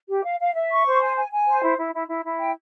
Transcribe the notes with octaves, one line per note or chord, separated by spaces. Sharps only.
G4
F5
F5
E5
C#6
C5
G#5
G#5
G#5
C5
E4
E4
E4
E4
E4
G5